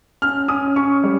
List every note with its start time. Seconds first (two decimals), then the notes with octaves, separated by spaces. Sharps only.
0.22 C#4 F6
0.48 C#4 D#6
0.76 C#4 C#6
1.04 G3